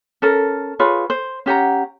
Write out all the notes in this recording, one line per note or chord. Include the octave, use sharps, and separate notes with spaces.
C#4 A4 A#4
F4 G#4 B4 C#5
C5
C#4 G4 F#5 A#5